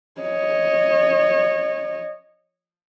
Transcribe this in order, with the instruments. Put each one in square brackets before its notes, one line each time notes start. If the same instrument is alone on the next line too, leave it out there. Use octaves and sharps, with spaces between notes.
[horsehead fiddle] C#5 D#5